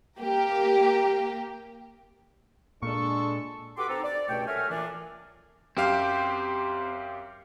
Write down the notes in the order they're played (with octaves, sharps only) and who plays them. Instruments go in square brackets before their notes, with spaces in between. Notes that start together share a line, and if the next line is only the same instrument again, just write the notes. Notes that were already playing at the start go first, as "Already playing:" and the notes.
[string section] A#3 G4 A#4
[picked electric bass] A#2 [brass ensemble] G#3 D4 A4 [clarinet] C#6
[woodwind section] F#4 G4 A4 B4 C6 D6
C4 D#4 A4
D5
C#2 G2 B2 A3 C#5 G5
F#3 A3 A#4 E5 G#5 F6
A#2 E3 D4
[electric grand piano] F#2 G4 F5 [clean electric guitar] C4